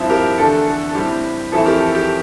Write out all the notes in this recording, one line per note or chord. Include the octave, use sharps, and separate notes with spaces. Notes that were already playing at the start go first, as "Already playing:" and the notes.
Already playing: G2 F3 C4 E4
G4 A#4
E2 D3 A3 D4 A4
A4
A4
A2 G3 C4 E4 G4
F2 E3 A3 C4 E4 A4
G4 A#4
A4
G4